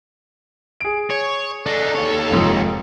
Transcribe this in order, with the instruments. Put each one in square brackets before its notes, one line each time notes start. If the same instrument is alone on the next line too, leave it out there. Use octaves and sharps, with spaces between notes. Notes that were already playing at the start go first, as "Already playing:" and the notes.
[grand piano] G#4 D7
[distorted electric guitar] C#5
[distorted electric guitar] D4 D#4 [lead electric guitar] A4
[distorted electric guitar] D#2 C#5
[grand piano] F1 G#2 F3